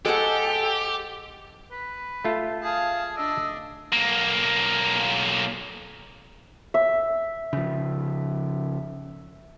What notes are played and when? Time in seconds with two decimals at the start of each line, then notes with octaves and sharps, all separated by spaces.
0.05 G#3 G4 A4 C5 F#5
1.71 B4
2.25 A3 F4 A4
2.63 G#4 F5 A5
3.17 D4 D#5 E6
3.92 B1 A#3
6.74 E5
7.53 C#3 F3